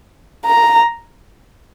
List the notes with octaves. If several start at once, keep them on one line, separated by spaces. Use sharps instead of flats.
A#5